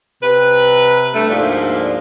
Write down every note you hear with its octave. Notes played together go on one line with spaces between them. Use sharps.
C3 B4
G2 A3
D2 G#2 F3 A#3 D4